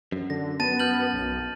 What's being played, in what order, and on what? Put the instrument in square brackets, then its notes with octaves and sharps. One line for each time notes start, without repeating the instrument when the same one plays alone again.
[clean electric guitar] F#2
[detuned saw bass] D3 [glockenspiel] A#6
[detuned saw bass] B3 [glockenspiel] A5 A6 D#7
[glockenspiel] F6 G6 F#7
[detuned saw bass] B1